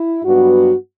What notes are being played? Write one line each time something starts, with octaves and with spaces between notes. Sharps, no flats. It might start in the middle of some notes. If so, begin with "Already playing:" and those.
Already playing: E4
G2 F#3 B3 F#4